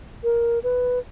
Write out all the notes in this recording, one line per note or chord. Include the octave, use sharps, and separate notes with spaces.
A#4
B4